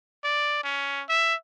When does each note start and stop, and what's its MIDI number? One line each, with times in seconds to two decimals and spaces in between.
0.24 0.63 74
0.64 1.03 61
1.09 1.35 76